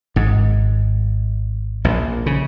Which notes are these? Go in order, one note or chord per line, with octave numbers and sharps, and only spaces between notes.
G#1 G#2
A#1 A#2
C#3